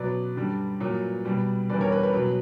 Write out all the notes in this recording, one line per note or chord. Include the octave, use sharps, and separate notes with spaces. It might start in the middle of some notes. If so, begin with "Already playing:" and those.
Already playing: B2 F#3 B4 D5
G2 D3 G3
A#2 F#3
B2 G3
E2 D3 G3 B4 D5
A#4 C#5
B4
B4
B2 F#3